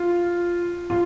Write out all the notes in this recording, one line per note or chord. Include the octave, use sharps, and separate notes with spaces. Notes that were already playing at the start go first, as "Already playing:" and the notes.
Already playing: F4
F4